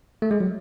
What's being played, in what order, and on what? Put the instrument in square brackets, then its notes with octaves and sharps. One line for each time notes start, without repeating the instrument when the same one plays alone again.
[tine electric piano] A3
G#3
F#3